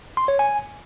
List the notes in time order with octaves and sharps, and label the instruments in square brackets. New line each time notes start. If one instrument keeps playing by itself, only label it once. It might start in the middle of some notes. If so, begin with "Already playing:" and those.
[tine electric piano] C6
C#5
G#5